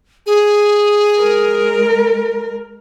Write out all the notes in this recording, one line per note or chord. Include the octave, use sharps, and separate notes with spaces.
G#4
G#3 A#4